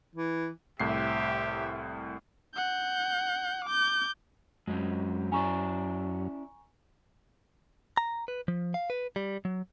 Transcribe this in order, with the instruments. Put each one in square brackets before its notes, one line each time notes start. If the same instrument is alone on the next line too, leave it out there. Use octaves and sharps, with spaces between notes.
[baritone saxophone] E3
[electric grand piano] C2 A2 C7 [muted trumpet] G4 [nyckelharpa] C5 E5
[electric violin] F#5 G6
D6 G6
[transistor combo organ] F#2 [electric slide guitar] G#3 C4 C#4
[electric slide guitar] C#4 E4 D5 [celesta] G#5 A#5 C#6
[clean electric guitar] A#5
B4
F3
F5
B4
G3
F#3